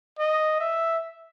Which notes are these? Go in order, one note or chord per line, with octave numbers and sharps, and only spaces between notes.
D#5
E5